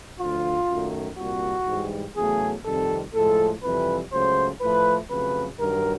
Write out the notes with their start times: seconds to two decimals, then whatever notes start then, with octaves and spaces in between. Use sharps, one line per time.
0.20 D2 D3 F3 F4
0.69 F#2 D#3 F#3 A3
1.18 C2 A#2 G3 F#4
1.67 G#2 E3 G3
2.17 E2 C#3 F#3 A3 G#4
2.65 F2 C3 D#3 G3 A4
3.15 A2 F3 G#3 A4
3.63 F2 C3 E3 G3 B4
4.12 C#2 C#3 F#3 A3 C5
4.61 A2 F3 A3 B4
5.10 F2 C#3 F#3 A3 B4
5.59 G2 D#3 F#3 A#4